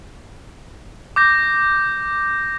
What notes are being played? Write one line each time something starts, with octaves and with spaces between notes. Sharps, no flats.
D6 G6 A#6